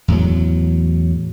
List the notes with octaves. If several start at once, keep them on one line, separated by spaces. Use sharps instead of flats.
E2 A2 F#3